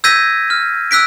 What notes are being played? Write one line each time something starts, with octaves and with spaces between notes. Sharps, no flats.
E6 G6 G#6 A#6 B6 D#7
F6
E6 F#6 B6 D7